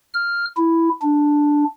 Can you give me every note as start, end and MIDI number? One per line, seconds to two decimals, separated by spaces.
0.14 0.45 89
0.57 0.89 64
1.02 1.64 62